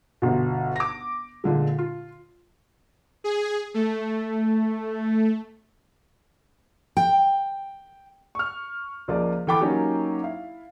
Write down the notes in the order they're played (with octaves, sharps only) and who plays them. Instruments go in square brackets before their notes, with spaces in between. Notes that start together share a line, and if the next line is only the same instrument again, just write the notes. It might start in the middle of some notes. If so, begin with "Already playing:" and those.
[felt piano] G1 B2
D6 A#6
A#2 D3 G#3
F4
[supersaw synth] G#4
A3
[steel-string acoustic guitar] G5
[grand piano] C#6 F6
C#2 F3 A#3 D5
E3 A4 G5 B5 D6 A6
F#3 A#3 C#4 D#4 G4
E4 F5